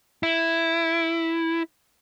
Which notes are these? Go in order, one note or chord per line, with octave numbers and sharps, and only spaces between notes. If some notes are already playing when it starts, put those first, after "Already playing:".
E4